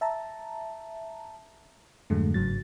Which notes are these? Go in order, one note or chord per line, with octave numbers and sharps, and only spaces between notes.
E5 A5 A#5
F2 G#2 D3 F#3 G#3 A3
G1 G#2 C#3 F#3 A6